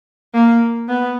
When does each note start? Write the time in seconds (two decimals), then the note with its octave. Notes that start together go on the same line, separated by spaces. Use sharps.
0.34 A#3
0.89 B3